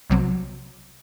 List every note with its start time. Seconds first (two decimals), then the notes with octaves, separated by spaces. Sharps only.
0.10 B1 C3 F#3